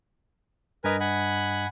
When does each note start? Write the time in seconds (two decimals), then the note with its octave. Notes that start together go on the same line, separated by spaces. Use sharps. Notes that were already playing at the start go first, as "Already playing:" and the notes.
0.84 G2 A#4 B4 D#5 G#5
1.00 F#5 G#5 B5